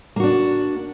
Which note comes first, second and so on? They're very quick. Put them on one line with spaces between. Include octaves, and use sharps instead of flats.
A#3 F#4 D4